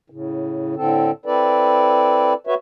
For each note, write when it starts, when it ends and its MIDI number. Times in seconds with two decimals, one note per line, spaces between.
0.10 0.75 45
0.10 0.75 49
0.76 1.11 45
0.76 1.11 50
0.76 1.11 60
0.76 1.11 69
1.26 2.34 60
1.26 2.34 64
1.26 2.34 69
1.26 2.34 71
1.26 2.34 74
2.47 2.55 66
2.47 2.55 71
2.47 2.55 73
2.47 2.55 76